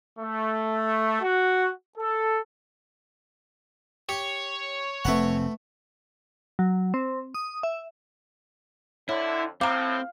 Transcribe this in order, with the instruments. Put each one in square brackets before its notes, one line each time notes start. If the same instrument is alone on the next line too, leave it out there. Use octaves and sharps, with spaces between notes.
[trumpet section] A3
F#4
A4
[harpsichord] G4 [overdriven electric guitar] C#5
[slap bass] F1 C4 [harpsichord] A3 B4 F#5
[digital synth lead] F#3
C4
D#6
E5
[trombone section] F2 D3 [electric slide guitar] E4 [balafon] C#5
[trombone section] A2 [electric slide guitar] C4 [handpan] F5 [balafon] A#5 D6